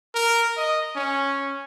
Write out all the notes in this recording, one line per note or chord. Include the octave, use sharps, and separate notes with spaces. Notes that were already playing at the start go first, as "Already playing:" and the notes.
A#4
D#5
C#4